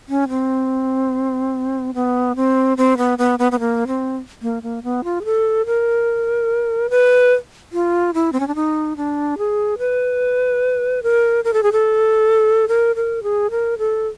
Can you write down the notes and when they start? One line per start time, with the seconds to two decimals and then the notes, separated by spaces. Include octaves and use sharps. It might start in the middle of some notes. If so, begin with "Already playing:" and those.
0.09 C#4
0.29 C4
1.94 B3
2.36 C4
2.77 C4
2.97 B3
3.18 B3
3.39 B3
3.52 B3
3.59 A#3
3.87 C4
4.42 A#3
4.63 A#3
4.83 B3
5.04 F4
5.21 G#4
5.25 A4
5.66 A#4
6.90 B4
7.72 F4
8.14 E4
8.32 C4
8.40 C#4
8.47 D4
8.55 D#4
8.97 D4
9.38 G#4
9.78 B4
11.03 A#4
11.44 A#4
11.53 A4
11.63 G#4
11.72 A4
12.68 A#4
12.96 A#4
13.23 G#4
13.51 A#4
13.78 A4